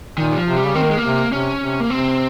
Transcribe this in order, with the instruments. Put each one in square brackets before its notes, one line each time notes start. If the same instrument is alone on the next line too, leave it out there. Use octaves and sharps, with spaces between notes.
[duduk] A#2 [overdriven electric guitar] D#3
[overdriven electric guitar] G3
F3
[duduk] C3
[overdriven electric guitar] G3
[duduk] C#3
[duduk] D#3 [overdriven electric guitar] C4
[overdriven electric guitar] A#3
G#3
A#3
[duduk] C3
[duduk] C3 [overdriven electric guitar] C#4
[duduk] C3
[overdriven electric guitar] A#3
[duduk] C3 [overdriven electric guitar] C4